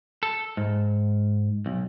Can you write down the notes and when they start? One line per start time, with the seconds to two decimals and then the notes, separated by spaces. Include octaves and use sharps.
0.23 A4
0.57 G#2
1.66 B1